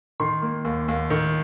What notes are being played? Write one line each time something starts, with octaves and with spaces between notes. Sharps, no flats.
D#3 C6
A#3
D#2
D#2
D#3